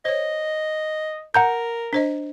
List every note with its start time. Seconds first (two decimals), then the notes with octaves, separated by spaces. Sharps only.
0.05 C5 C#5 D#5
1.34 A#4 F#5 A#5 G6
1.93 D4 C5 D#5